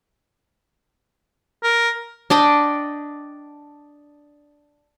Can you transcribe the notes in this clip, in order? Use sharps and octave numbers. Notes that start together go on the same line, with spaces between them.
A#4
D4 D5 D#5 G5